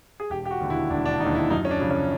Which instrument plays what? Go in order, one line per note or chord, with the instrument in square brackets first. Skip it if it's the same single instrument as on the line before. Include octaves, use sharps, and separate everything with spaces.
[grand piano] G#4
E1 G4
G4
F#4
D#2 D3
E4
E1 D4
D4
D3 D#4
D#2
E4
F#2 D#4
C#4
D4
C#3 F3
C#4